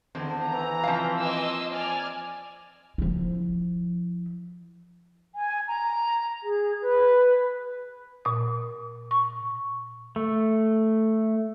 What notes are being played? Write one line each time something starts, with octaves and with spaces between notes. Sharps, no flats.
E2 D3 D#3 C4
E3 A#5
F3 G3 C4 F5
A#3 C4 D#5 C6 E6
D5 G#5 F6
F3 E4
G#5
A#5
G#4
B4
A#2 D#6
C#6
A3